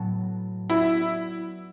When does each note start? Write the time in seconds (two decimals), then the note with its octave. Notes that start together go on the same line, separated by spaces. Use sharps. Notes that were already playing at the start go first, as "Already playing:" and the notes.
Already playing: A2 F#3 B3 F#4 A4
0.69 B3 E4 F#4 B4 D5